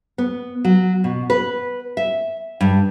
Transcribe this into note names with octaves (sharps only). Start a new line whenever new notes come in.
B3
F#3
B2
B4
E5
G2